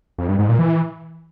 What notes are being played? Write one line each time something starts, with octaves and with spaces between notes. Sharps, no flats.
F2
G2
G#2
A#2
E3